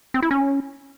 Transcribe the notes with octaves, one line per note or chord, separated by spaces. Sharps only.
C4
E4
C#4